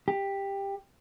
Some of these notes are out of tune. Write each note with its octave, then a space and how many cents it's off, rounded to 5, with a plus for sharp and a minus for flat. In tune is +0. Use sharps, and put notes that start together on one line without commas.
G4 +10